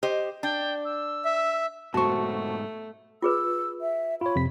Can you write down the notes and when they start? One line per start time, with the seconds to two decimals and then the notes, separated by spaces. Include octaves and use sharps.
0.03 G4 C5 D#5
0.43 D4 G5
0.85 E6
1.25 E5
1.94 G#2 B2 A3 F#4 C5 A5 C#6
3.22 F4 G#4 B4 E6
3.81 E5
4.21 F4 C#5 B5
4.36 F2 C3 B6